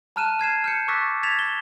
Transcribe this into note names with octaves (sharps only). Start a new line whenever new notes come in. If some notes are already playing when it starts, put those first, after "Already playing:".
A5 A#5 F6 F#6 D#7 E7
F6 G#6 C7 E7
F6 G6 C#7
C#6 D6 E6 F#6 A6 B6
G#6 A6 B6 E7 F7
G7